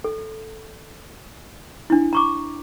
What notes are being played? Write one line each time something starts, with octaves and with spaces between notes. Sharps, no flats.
A4
D4 E4
A#5 C#6 D6